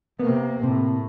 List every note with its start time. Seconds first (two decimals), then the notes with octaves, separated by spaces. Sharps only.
0.19 C3 A#3 B3
0.63 A2 C3